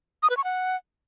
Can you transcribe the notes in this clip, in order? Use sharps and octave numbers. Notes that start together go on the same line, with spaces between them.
D#6
B4
C#6
F#5